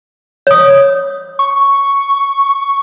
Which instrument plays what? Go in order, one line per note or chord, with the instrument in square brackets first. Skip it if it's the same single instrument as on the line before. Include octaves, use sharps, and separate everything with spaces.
[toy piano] C#5 D#6
[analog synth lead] C#6